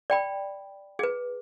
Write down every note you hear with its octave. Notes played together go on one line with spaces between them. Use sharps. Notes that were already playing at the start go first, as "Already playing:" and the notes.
D5 G5 B5
G#4 B4